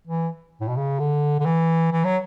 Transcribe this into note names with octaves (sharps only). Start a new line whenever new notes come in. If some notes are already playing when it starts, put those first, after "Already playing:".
E3
A2
B2
C#3
D3
D3
E3
E3
F#3